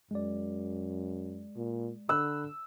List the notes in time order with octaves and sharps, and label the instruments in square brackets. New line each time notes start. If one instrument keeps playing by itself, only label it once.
[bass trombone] F#2 [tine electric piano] G#3 D5
[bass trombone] A#2
[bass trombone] D3 [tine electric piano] B5 F#6 [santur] E6